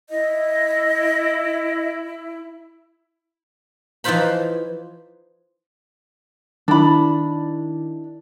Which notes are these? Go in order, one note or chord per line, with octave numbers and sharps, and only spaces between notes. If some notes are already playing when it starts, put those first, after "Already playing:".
E4 D#5
E3 F3 D#4 F4 C5 B5
D#3 D4 E4 B5